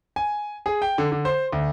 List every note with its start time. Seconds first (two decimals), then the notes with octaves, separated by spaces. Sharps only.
0.16 G#5
0.66 G#4
0.82 G5
0.98 D3
1.12 D3
1.25 C5
1.53 D2